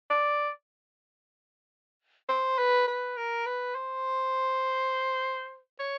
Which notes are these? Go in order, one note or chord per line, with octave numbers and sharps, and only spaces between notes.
D5
C5
B4
B4
A#4
B4
C5
C#5